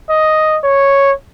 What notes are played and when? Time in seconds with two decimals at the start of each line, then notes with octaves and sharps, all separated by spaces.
0.10 D#5
0.64 C#5